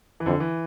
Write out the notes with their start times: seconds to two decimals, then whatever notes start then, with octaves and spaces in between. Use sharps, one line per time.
0.20 E3
0.26 F2 D3
0.40 E3